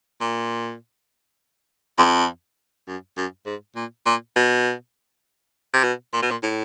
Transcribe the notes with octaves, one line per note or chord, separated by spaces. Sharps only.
A#2
F2
F#2
F#2
G#2
A#2
A#2
B2
C3
B2
A#2
B2
A#2
A2